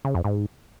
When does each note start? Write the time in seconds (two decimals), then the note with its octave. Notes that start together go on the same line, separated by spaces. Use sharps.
0.05 C#3
0.15 F2
0.24 G#2